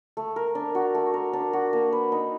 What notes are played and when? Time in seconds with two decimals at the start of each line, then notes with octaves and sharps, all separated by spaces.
0.17 A3
0.36 A#4
0.55 D4
0.75 F#4
0.95 A3
1.14 A#4
1.33 D4
1.53 F#4
1.73 A#3
1.92 B4
2.12 D#4